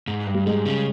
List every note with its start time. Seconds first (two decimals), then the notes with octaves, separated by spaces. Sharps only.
0.08 G#2
0.26 G2
0.34 G3
0.46 G#2 G#3
0.65 C#3